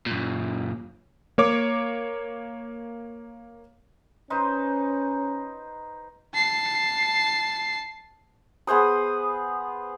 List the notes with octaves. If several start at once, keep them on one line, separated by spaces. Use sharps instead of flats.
F#2 A#2
A#3 C#5 D6
C#4 D#4 B4 C5
A5 C7
B3 G#4 C5 D#6